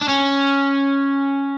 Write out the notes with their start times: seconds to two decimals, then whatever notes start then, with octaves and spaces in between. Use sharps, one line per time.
0.02 D4
0.09 C#4